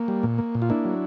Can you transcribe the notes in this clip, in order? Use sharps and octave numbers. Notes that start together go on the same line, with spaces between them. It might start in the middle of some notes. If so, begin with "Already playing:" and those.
Already playing: A#3
G3
A#2
A#3
A#2
F4
A#3 D4 E4
F#3